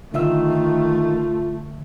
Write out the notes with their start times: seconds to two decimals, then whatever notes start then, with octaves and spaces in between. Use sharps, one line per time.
0.14 D3 D#3 A3 F4 E5 E6